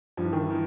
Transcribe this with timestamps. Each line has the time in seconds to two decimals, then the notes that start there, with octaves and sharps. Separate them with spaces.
0.17 G2 F3
0.25 E3
0.33 D#3
0.40 E3
0.50 D#3